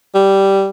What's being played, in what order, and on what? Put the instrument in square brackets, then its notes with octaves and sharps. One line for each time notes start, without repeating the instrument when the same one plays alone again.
[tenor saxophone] G3